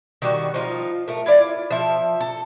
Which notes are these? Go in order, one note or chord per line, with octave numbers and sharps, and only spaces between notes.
D#3 G3 F#4
F3 D#4 F4
A3 A#4
E4 F4 D5
F3 E5
A4